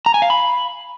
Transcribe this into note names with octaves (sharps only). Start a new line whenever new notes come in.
A#5
G#5
F5
B5